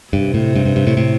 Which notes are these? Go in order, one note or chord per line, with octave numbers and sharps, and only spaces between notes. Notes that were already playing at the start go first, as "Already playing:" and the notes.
G2 C3
A2
G2
G2
G2
A2
A2